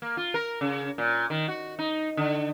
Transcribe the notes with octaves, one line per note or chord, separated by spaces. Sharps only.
A#3
F4
A#4
C#3
A#2
D#3
F#4
D#4
D3